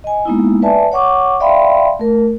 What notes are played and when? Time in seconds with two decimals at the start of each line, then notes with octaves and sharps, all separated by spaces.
0.04 D#5 G#5
0.25 G#3 A#3 B3 D#4 E4
0.62 B4 D5 E5 G#5 A5
0.92 C#5 F#5 C#6 D6
1.40 D5 E5 F5 G5 B5 C6
1.99 A3 A#4